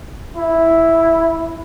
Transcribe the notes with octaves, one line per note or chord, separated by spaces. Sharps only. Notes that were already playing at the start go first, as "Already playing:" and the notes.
E4